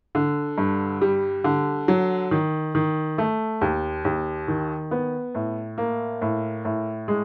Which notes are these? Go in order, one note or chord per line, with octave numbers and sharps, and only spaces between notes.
D3
G2
G3
D3
F#3
D#3
D#3
A3
D#2
D#2
D#3
B3
A2
A#3
A2
A2
G#3